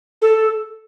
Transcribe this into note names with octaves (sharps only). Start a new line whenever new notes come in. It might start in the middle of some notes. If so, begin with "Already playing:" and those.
A4